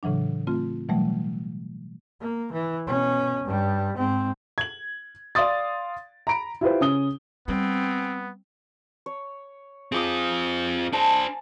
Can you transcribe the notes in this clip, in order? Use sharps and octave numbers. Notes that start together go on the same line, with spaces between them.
A2 C#3 E3 F#3 D4
A3 C4 F4
B2 E3 F#3 G3 A3
A#3
E3
B2 C#4
G2 G3
G#2 C4
G#6 F#7
D5 F5 C6 D#6 A6
A#5 B5 D7
E4 F4 G4 B4 C5
C#3 C#4 D#6 G7
G3 B3 C4
C#5
C4 F4 G#4 D6 D#6
D4 C5 G#5 A5